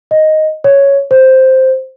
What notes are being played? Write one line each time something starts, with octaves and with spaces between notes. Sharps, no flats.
D#5
C#5
C5